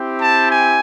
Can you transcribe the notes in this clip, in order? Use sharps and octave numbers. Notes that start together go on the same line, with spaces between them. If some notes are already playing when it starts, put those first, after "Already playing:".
Already playing: C4 E4 G4
A5
G#5